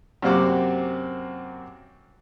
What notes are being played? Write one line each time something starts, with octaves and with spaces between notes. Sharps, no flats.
F#2 C3 A#3 C4 F#4 D6